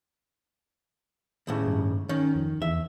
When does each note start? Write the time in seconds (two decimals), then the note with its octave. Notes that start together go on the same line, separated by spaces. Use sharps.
1.47 D#2 A2 C#3
1.67 G2
2.09 D#3 C#4
2.36 F2
2.62 E2 E5